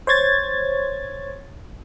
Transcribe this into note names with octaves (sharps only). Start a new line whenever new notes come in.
C5 C#5 G#6 A6